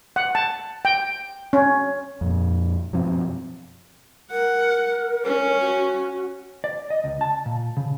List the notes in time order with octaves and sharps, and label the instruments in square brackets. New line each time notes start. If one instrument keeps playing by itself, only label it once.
[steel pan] F#5
A5
G5
C#4
[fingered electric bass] F2 A#2
F#2 B2 F3 C4
[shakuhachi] A#4 [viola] F#5
[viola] C#4
[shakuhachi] F#4
[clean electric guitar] D5
D#5
C#2
A5
A#2
C#3